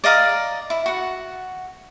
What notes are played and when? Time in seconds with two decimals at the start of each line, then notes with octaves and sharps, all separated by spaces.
0.04 D5 D#5 F5 A#5
0.70 E4
0.86 F#4 F#5